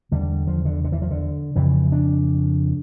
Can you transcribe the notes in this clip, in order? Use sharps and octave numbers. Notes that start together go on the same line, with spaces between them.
E2 D3 G3
F3
D3
D3
E3
F3
D3
F2 C#3 E3
D4